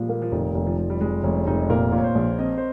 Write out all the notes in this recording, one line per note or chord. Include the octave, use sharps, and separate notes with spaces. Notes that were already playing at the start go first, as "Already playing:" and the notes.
Already playing: A#2 F3 G3 G#3
A#3
F3
F1 D#3
F1
F3
F1
G3
F1 G#3
F1 C#4
F1 D#4
A#2 A#4
A#2
C#5
C5
A#1
C4 D#5
C5